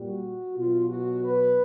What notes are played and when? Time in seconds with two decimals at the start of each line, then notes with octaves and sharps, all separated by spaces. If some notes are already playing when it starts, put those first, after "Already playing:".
Already playing: A#2 G3 F#4
0.56 B2 F#3 F4
0.89 F#4
1.23 B4